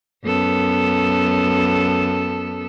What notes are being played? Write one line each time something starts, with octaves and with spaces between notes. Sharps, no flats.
F#2 B3 A4